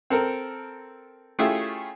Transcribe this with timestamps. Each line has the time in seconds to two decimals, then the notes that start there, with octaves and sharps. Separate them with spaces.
0.10 C4 A4 A#4
1.39 A3 C#4 E4 F4 G4 G#4